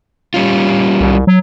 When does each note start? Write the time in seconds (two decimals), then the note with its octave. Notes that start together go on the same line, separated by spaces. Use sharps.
0.34 G3 C#4 F4
1.01 C2
1.27 F#3